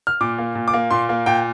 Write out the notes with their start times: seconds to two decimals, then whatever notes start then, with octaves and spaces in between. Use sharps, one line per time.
0.07 F6
0.21 A#2 D6
0.38 A#3
0.55 A#2
0.68 D6
0.74 A#3
0.91 A#2 C6
1.09 A#3
1.26 A#2 G5